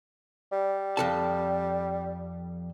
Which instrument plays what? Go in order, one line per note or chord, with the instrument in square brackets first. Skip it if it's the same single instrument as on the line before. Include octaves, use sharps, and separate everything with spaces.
[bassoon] G3
[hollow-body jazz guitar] F2 A4 A5